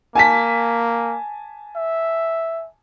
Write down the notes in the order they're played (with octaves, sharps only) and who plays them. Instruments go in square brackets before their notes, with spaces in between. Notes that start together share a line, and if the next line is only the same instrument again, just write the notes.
[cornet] A#3 [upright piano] G#5 A5 B6
[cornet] E5